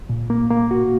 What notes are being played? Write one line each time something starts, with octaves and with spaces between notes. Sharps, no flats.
A#2
A#3
A#3
F#4